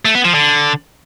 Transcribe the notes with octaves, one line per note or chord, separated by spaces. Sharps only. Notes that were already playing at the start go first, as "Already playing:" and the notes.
A3
B3
F3
D3